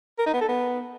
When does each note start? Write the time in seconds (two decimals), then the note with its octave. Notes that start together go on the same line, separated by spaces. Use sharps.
0.19 A#4
0.26 D#4
0.34 B3
0.41 A4
0.49 B3